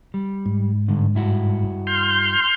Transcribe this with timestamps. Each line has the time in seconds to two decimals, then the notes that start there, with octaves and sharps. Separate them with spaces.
0.14 G3
0.46 G#2
0.88 G2 D3
1.15 G2 E4 F#4
1.87 C6 F6 G6